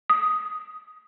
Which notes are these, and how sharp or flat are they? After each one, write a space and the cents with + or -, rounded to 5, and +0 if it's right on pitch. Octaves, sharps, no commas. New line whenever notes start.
D#6 +5